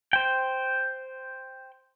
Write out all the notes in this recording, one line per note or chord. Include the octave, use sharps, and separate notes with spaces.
C5 G5